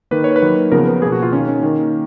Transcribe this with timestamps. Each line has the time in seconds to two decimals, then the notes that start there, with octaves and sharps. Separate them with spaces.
0.11 D#3 A#3 B4
0.24 C#5
0.36 B4
0.42 D#3 F#3 A#3
0.72 C#3 F3 B3 A#4
0.87 B4
1.02 B2 A#3 G#4
1.12 F#4
1.23 F4
1.32 D#3 C#4
1.36 A#3
1.48 C#4
1.63 D#3 A#3